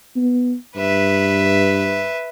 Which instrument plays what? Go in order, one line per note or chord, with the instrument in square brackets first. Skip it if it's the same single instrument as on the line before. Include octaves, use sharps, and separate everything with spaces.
[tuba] B3
[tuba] G2 [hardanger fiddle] B4 E5